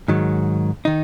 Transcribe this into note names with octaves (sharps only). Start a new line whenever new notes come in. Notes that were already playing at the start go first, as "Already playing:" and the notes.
G#2 D#3 F#3
D#3 D#4